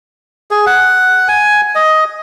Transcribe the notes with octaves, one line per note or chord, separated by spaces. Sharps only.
G#4
F#5
G#5
D#5